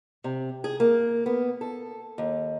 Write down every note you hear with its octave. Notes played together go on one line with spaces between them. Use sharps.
C3
G#4
A#3
B3
A4
D#2